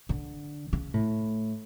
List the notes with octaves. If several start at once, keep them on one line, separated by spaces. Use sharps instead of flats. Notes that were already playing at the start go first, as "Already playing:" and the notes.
D3
C#3
A2